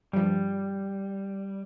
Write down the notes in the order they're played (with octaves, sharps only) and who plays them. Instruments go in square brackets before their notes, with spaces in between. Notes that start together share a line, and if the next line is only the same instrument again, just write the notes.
[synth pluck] G2 F3 [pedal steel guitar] G3